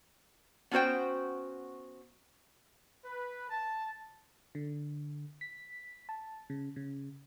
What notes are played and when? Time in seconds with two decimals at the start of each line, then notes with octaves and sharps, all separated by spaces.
0.71 B3 C#4 F#4 C5 G5
3.04 B4
3.48 A5
4.55 D3
5.41 B6
6.09 A5
6.50 C#3
6.76 C#3